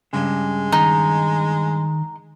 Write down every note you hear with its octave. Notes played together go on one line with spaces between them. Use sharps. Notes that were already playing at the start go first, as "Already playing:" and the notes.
G2 C#3 G#3
D#3 D#4